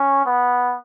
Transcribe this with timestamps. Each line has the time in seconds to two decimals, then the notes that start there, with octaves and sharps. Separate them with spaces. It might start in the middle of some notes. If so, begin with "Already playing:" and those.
Already playing: C#4
0.25 B3